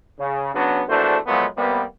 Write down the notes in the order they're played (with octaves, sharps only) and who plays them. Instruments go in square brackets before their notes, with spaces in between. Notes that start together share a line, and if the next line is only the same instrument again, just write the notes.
[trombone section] C#3
C#3 F#3 B3 C#4 D4
A#1 E2 A3 D4 F#4 C5
A#2 F3 F#3 G#3 A3 B3
C3 G3 A#3 B3